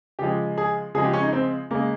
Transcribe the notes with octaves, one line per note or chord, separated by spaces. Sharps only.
C#3 F3 G#3 G4
G#4
C#3 F3 G#3 G#4
G4
C#4
D#4
C4
C#3 G#3 A#3